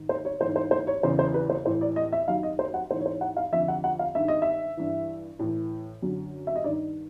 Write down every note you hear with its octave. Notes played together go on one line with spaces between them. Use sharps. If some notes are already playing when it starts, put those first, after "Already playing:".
Already playing: G#2 D#3
C5
C#5
G#2 E3 C5
C5
C5
C#5
E2 C#3 E3 C5
C5
B4
C5
A2 E3 C5
D5
D#5
E5
F#2 D#3 F5
D#5
C5
F#5
G#2 E3 C5
C#5
C5
F#5
F5
F2 D3 E5
F#5
F#5
F5
G2 D#3 E5
D#5
E5
G2 E3
A2 E3
F#2 D3
E5
D#5
G2 D#3 D5